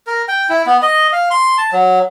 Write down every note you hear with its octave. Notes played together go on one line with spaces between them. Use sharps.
A#4
G5
E4
B3
D#5
F5
C6
A5
F#3